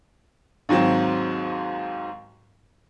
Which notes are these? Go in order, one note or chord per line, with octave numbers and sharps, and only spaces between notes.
D#2 G#2 F#3 C4